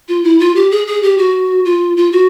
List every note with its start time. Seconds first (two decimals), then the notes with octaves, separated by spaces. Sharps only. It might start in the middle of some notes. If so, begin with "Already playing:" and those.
0.09 F4
0.24 E4
0.40 F4
0.55 G4
0.71 G#4
0.87 G#4
1.03 G4
1.18 F#4
1.65 F4
1.97 F4
2.12 F#4